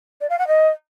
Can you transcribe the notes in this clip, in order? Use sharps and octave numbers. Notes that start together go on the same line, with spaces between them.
D5
F5
F#5
D#5